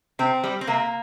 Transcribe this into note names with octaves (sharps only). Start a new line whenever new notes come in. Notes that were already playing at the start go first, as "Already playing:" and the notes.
C3 C4
G3
C4
C3 A#3